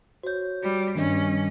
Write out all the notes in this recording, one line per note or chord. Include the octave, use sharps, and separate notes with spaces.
F#4 C5 C#5 G6
G3 F#4
G2 D#3 G3 C#4 D4 D#5